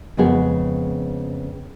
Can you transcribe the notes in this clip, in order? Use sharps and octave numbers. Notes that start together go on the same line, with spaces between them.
F2 C#3 G#3 B3 G#4